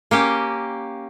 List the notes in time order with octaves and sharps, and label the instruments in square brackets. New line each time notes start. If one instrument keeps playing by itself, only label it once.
[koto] A#3 C#4 G4